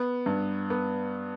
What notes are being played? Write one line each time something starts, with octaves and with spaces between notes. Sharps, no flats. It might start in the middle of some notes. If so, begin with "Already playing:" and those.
Already playing: B3
G2
B3